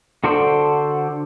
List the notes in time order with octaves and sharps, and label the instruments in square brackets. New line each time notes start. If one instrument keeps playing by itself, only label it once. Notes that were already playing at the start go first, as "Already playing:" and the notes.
[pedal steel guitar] D3 F#4 A4 C5 D5